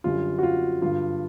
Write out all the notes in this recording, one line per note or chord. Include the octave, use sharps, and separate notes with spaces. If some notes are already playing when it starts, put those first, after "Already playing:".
F#2 D3 G3 F4
F#4
F4
G2 D3 F#3 F4